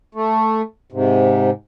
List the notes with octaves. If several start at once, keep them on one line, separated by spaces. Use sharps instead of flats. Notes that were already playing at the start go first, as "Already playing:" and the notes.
A3
G#2 C3